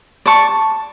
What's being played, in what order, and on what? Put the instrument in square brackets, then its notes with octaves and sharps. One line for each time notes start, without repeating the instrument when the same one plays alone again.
[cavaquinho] D5 A5 C#6